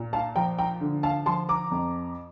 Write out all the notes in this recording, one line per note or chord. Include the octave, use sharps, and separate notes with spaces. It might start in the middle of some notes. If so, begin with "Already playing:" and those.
Already playing: A#2
F5 A5
F3 G5 A#5
G5 A#5
D3
F5 A5
F3 A5 C6
A#5 D6
F2